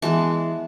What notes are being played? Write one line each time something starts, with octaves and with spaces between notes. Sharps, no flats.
E3 G#3 B3 A5